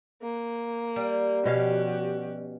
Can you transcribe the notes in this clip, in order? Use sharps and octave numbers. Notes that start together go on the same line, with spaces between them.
A#3
G3
B2 F3 C#4 F#4 G4 F5